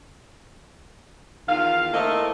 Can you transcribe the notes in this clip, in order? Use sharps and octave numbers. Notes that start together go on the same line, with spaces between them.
E2 D#3 F4 F5
A3 A#3 C4 E4 A4 D#5